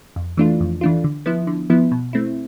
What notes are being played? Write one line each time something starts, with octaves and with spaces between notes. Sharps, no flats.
F2
E3 A3 D4 F4
F2
E3 A3 D4 F4
D3
F3 B3 E4
D3
F3 B3 E4
B2
A3 C4 E4